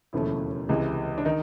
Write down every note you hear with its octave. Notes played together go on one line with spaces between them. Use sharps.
E1 D#2 C#3 F3 A3 E4
C#2 C3 E3 G#3
D4
D#3 D#4